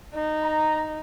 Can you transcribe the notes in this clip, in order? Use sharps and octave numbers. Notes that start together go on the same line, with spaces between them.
D#4
A#5